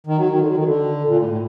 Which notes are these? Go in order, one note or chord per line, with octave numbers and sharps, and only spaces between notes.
D#3
F#3
D#3
D3
F#3
D#3
D3
A#2
A2
A2